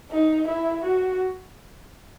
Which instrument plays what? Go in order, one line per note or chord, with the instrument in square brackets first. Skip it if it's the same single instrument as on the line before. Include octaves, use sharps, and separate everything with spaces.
[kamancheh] D#4
E4
F#4